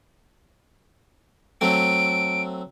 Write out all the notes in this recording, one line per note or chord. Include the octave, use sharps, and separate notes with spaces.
F#3 A3 C4 D7